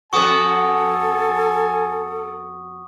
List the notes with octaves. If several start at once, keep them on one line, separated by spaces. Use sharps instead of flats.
F2 B3 F#4 A4 G#5 C#6 D#6